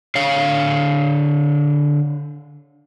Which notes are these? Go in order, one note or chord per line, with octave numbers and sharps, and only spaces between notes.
D3 C#5 F5